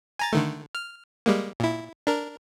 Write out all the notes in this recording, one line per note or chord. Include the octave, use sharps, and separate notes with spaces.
G#5 A#5 A6
D3 D#3 A3
F6
G3 G#3 A#3
A#2 E4
D4 A#4